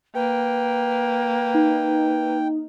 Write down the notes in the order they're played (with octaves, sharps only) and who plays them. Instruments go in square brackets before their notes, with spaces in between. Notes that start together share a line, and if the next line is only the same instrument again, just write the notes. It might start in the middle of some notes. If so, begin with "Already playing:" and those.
[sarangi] A#3 [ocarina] B4 [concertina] G5
[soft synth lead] D#4